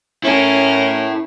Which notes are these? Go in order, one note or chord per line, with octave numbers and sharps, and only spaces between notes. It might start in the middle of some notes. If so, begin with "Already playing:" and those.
C#4 E4 A4 A#4